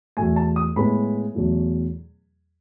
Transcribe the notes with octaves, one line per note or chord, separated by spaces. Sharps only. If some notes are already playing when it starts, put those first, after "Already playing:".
E2 B2 A3 G#5
A5
D#6
A2 G#3 B3 B5
E2 B2 F#3 A3